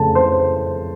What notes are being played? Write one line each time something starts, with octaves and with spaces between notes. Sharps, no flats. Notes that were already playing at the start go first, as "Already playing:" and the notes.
Already playing: F2 C#3 A3 A5
C5